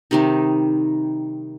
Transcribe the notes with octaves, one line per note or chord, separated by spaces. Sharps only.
C3 D#3 G3 D#4